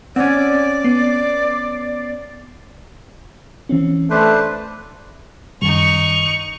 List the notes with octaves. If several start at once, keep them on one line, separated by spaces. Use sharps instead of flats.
C4 C#4 D5 F#5
B3 C7
E3 C4 C#4
A3 D4 B4 C5
F#2 D#3 G3 D#4 C#6 F7